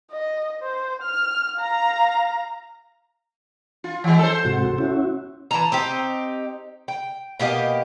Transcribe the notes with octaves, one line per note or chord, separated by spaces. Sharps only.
D#5
C5
F6
F5 A#5
F4
E3 G#3
A4 C5
G#2 C3 F#4
C#4 E4 F#4
E3 A5 A#5
C4 D#4 G4
G5
B2 A#3 G4 D#5